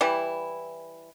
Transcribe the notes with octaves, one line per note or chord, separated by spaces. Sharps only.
E3 G3 E4